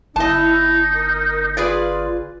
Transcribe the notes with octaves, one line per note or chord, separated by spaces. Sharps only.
G1 D#4 E4 D#5 A5
A#4
F4 G#4 B4 D5